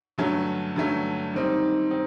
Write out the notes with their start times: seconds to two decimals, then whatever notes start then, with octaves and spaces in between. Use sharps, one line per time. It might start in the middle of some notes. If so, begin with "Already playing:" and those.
0.18 G2 D3 F#3 A3 C#4
0.76 G2 D3 F#3 A3 C#4
1.33 D#3 G3 C4 D#4
1.91 C4 D#4